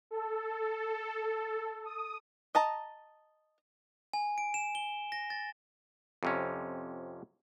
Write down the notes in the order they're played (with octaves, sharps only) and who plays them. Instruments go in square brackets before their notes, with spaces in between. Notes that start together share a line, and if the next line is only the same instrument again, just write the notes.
[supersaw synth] A4
D#6
[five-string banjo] D#5 A5 A#5
[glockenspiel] G#5
D7
E7
G7
A#6
A6
[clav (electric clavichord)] F2 C3 C#4